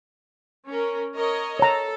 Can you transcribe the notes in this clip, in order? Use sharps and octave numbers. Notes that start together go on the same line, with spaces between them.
C#4 A#4
A#4 C#5 D#5
A4 C#5 A#5